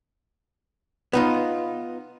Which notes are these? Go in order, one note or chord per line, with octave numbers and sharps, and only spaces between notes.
B3 D#4 F4